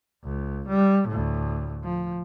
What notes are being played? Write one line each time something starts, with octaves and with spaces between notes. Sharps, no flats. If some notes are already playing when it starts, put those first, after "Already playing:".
C#2
G3
D2 A2
F3